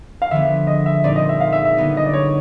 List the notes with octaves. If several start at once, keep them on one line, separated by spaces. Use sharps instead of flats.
F5
D3 F3 G#3 B3 E5
D#5
E5
A#2 G3 C4 D#4 D5
D#5
E5
F5
E5
E5
D3 F#3 B3 D#4
D#5
D5
C#5